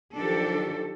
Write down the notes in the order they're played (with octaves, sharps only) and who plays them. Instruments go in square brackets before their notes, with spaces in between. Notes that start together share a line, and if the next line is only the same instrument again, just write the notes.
[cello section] D#3 F3 F#3 D4 G4 A4